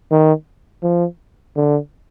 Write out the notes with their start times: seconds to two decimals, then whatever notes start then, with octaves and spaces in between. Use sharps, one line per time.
0.11 D#3
0.83 F3
1.56 D3